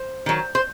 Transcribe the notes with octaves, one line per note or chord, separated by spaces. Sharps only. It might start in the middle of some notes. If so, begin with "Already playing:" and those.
Already playing: C5
D#3 F#3
C5